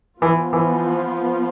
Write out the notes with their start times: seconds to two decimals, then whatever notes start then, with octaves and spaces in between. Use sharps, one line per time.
0.21 E3 F3 B3 F4
0.53 E3